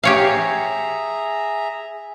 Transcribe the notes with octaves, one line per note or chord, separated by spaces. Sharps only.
G4 G#4 C#5 E5 F5 A#5